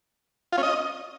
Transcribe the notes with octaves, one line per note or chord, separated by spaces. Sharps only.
F4
C#4
D#5